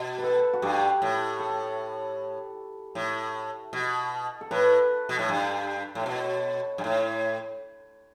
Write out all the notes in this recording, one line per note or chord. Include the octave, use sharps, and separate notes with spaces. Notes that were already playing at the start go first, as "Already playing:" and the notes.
Already playing: B2
B4
A4
F#4
G2 G4
A2
A4
A2
B2
A4
A2 B4
B2
A2
G2
A2
B2 C#5
G2
A2